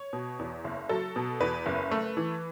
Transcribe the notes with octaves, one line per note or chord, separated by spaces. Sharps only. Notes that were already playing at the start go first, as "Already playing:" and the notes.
Already playing: C#5
B2
E2
F#1
F#3 A4
B2
E2 B4
F#1
A3
E3